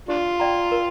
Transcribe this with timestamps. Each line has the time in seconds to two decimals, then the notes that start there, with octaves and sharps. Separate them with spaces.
0.08 D4 F4 G4
0.40 D5 G5 A#5
0.72 A#4